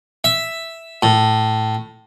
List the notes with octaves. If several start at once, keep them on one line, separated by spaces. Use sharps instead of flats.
E5
A2